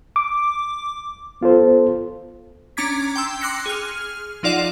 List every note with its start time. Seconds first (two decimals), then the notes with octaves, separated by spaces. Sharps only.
0.16 D6
1.41 B3 F4 A4 C5
2.77 C#4 D4 A#5 D6 G#6 B6
3.16 G5 C6 E6
3.41 C6 D6 F#6 A#6 C#7
3.66 G#4 F6
4.43 F3 D#4 F4 D5 F#5 E7